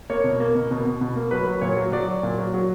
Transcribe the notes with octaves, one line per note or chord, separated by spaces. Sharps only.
A#3 C#5
B2
A#3
B2
B2
B2
B2
A#3
F#3 B4
F#3
A#2 C#5
F#3
F#3 D5
F#3
A#2
F#3
F#3